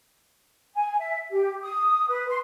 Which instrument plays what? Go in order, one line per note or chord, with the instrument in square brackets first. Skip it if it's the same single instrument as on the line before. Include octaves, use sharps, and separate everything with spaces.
[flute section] G#5
E5
G4
D#6
B4
C6